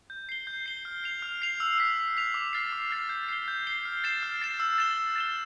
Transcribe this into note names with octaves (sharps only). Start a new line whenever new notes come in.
G6
C7 G7
G6
C7 G7
F6
C7 F7
F6
C7 F7
E6
B6 F7
E6
B6 F7
D6
F6 A6 C7
D6
F6 A6 C7
G6
C7 G7
G6
C7 G7
F6
A6 C7 E7
F6
A6 C7 E7
E6
A6 E7 G7
E6
A6 E7 G7